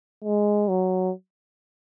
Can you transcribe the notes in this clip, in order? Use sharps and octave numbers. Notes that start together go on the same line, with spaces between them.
G#3
F#3